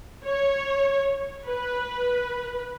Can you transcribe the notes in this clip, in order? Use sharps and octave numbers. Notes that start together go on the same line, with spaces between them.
C#5
B4